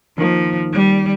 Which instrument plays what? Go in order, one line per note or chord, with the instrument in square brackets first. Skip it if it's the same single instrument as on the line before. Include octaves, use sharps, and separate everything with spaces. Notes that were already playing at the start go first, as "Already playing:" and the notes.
[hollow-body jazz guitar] D#2 D#3 A#3 [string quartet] F3
[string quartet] G3